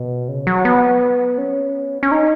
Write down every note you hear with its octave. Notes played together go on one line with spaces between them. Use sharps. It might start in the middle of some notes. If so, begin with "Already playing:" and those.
Already playing: B2
C#3
F#3
B3
C#4
C#4
D#4